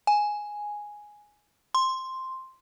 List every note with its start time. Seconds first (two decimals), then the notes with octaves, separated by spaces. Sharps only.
0.07 G#5
1.75 C6